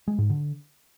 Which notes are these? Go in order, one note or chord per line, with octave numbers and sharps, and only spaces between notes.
G#3
G#2
D3